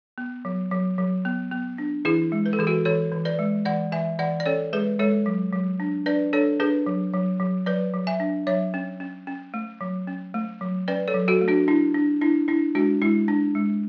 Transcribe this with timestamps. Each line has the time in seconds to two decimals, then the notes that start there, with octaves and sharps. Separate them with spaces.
0.18 B3
0.45 F#3
0.71 F#3
0.98 F#3
1.25 B3
1.52 B3
1.78 D4
2.05 E3 E4 G#4
2.32 G#3
2.46 B4
2.53 A4
2.59 E3 G#4
2.67 F#4 A4
2.85 E3 A4 C#5
3.12 E3
3.25 B4 D5
3.39 G#3
3.65 E3 D5 F#5
3.92 E3 E5 G#5
4.19 E3 D5 F#5
4.40 D5
4.46 C#4 A4 C#5
4.73 G#3 G#4 B4
4.99 G#3 A4 C#5
5.26 F#3
5.53 F#3
5.80 D4
6.06 D4 B4 D5
6.33 D4 A4 C#5
6.60 D4 G#4 B4
6.86 F#3
7.13 F#3
7.40 F#3
7.66 F#3 B4 D5
7.94 F#3
8.07 E5 G#5
8.20 D4
8.47 F#3 C#5 E5
8.74 C#4
9.00 C#4
9.27 C#4
9.54 A3
9.81 F#3
10.07 C#4
10.34 A3
10.61 F#3
10.88 C#4 B4 D5
11.08 A4 C#5
11.14 F#3
11.28 F#4 A4
11.41 A3
11.48 D4 F#4
11.68 D4 E4
11.94 D4
12.21 D4 E4
12.48 D4 E4
12.75 G#3 D4 F#4
13.02 G#3 E4
13.28 D4
13.55 G#3